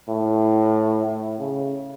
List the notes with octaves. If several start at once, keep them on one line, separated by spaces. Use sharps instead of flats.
A2
A2
C#3